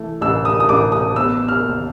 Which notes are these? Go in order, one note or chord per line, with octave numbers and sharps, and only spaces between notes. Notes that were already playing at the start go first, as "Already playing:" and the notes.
Already playing: E3 A3
A1 E6
D#6
D#6
A1 D6
D#6
B3 E6
F6
D#2